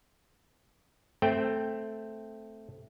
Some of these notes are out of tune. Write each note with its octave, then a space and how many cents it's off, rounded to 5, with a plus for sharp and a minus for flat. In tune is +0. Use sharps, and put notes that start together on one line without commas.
A3 +0 C4 +0 G5 +0